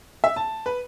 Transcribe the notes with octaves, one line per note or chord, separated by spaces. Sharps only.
E5
A5
B4